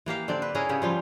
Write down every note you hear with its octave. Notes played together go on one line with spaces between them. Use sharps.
E3 A#3 G4 F5
D3 C4 D4 D5
B4
C#4 E4 G#4 A#4
C#3 B3 G4
F3 G3 F4